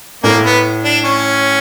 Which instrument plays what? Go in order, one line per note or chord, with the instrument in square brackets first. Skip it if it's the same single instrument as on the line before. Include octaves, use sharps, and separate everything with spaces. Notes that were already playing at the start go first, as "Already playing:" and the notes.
[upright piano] A2 A3 [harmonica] A#3
[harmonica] B3
D4
C#4